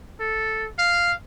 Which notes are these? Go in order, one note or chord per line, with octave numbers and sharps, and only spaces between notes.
A4
F5